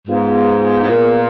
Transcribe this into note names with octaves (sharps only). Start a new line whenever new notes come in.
G#2 B3 F4 G#4 B4 F5
G#2
A#2